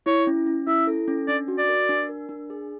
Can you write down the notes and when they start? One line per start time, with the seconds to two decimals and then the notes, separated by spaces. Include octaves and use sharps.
0.06 E4 C#5
0.27 C#4
0.47 C#4
0.67 E4 E5
0.87 A4
1.08 C#4
1.28 D4 D5
1.48 F#4
1.58 D5
1.69 A#4
1.89 D4
2.09 A#4
2.29 D4
2.50 G#4